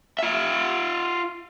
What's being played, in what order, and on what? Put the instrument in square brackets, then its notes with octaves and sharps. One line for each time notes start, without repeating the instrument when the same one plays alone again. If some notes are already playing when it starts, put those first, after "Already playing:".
[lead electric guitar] F4 E5